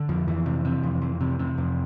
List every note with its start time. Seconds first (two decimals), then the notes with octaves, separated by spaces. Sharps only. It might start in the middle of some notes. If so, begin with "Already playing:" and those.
Already playing: D3
0.09 F2 F3
0.27 F2 E3
0.46 C3
0.65 C3
0.83 F2
1.02 F2
1.21 C3
1.39 C3
1.58 F2